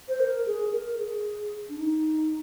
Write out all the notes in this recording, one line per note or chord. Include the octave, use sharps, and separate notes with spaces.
C5
A#4
G#4
A#4
G#4
D4
D#4